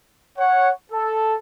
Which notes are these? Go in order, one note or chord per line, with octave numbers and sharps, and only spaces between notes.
C#5 F#5
A4